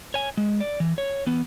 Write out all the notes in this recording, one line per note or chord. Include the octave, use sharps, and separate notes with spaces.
C#5 G#5
G#3
D5
E3
C#5
E3 B3